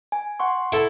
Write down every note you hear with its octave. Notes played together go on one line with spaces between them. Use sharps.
G#5
F#5 C6 C#6
E4 A4